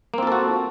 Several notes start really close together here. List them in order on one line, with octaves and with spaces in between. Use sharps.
A#3 C4 F4 A4 F#4